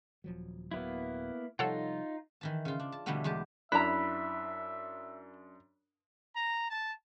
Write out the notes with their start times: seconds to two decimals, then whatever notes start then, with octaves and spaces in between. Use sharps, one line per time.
0.24 D#1 F3 F#3
0.71 D1 F#3 A#3 B3 E4
1.59 C3 F3 G3 D#4 F4 A4 C#5 F#5
2.41 D#3 E3 A5
2.65 C#3 F4
2.79 D4
2.92 A5
3.06 B2 D3 E3 G3 A3 B3
3.24 E2 G#3 G4 A5
3.72 F#2 D4 E4 E5 A#5 B5 F#6 B6
6.36 A#5
6.70 A5